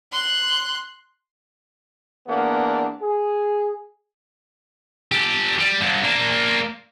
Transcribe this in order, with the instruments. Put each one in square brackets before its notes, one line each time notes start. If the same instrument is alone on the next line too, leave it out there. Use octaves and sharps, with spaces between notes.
[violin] C6 F#6
[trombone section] E2 A#3 B3 D4
G#4
[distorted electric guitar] G4 A4
G3
G2 D3
A#3 D4